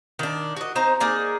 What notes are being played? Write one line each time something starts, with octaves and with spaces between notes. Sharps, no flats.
D#3 D4
F#4 D#5
C4 D#4 C5 A#5
A#3 D#4 G#4 D5